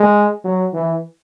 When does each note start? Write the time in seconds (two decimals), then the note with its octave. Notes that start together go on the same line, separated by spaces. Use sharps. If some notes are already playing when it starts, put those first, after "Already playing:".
Already playing: G#3
0.44 F#3
0.73 E3